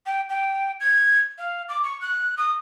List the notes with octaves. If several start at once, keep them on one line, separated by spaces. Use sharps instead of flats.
G5
G5
G#6
F5
D6
C#6
F#6
D#6